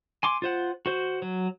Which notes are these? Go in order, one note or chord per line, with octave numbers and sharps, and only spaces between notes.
G#5 C6 D6
F4 C5 F#5
F#4 C5
F#3